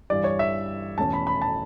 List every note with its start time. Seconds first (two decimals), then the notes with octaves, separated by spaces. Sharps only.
0.10 G2 E3 G3 D5
0.24 C#5
0.39 E5
0.98 E2 B2 A3 C#4 A5
1.13 B5
1.27 B5
1.42 A5